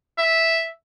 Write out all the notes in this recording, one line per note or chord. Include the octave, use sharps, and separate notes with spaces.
E5